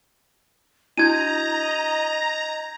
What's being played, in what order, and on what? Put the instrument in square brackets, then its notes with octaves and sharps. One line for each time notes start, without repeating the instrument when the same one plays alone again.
[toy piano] D4 E4 F#4 [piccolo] D#5 [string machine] A#5 [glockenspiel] G6 G#6 D#7